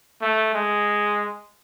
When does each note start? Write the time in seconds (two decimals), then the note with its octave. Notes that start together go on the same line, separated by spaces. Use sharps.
0.22 A3
0.54 G#3